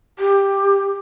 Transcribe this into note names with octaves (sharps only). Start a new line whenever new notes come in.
G4